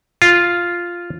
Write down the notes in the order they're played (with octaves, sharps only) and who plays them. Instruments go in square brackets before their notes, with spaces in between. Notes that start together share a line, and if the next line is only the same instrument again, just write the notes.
[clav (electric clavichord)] F4